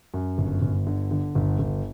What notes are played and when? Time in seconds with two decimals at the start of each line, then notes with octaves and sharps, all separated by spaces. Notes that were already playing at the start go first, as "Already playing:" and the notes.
0.14 F#2
0.38 G1
0.62 G1
0.87 D3
1.11 D3
1.35 G1
1.59 G1